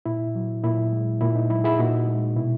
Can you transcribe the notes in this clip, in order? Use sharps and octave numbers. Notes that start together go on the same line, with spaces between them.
A#2 E4
F#3
A#2 E4
G#3
A#2 E4
D#4
F#3 E4
E4 G#4
A#2 D#4 F#4
G#3
B2 E4